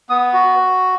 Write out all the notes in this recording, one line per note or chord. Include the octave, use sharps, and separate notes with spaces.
B3 D#6
F#4